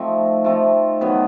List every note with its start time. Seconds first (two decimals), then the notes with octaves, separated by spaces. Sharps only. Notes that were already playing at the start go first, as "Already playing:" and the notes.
Already playing: F3 A3 C4 D#4
0.44 F3 A3 C4 D#4
1.01 D#3 F#3 B3